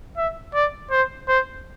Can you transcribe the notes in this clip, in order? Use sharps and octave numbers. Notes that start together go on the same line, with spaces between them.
E5
D5
C5
C5